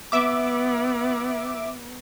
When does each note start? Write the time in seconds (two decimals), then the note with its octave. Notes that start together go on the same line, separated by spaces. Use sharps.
0.12 B3 E5 D6